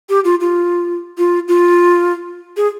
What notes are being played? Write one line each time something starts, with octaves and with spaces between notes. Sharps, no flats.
G4
F4
F4
F4
F4
G#4